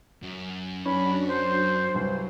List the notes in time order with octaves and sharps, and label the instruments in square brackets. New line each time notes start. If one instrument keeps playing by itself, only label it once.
[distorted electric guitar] F#2
[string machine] F#3 D4 F#4 [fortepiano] C#4 [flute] B5
[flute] C5
[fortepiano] C2 G2 [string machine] F#3